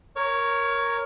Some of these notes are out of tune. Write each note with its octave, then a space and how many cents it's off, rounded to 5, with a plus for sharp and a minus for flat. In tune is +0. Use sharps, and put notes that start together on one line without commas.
A#4 +0 C#5 +0 C#6 +45